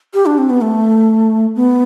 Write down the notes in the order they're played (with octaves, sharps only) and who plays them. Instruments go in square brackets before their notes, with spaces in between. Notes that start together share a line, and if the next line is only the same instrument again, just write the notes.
[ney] G4
D4
C4
B3
A3
B3